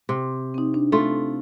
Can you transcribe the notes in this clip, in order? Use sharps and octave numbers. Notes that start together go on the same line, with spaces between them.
C3
C4 D#4
D4
A3 F4